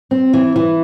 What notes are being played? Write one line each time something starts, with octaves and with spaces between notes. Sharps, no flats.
C4
E3
E3